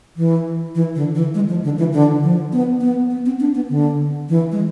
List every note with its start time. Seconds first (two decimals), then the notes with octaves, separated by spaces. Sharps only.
0.17 E3
0.75 E3
0.95 D3
1.15 E3
1.34 G#3
1.49 F3
1.64 D3
1.79 E3
1.93 D3
2.23 F3
2.53 B3
2.81 B3
3.10 B3
3.25 C4
3.40 D4
3.55 B3
3.70 D3
4.29 E3
4.52 G#3